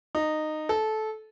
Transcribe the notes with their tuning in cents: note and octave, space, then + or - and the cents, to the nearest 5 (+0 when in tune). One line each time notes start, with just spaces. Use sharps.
D#4 -15
A4 -20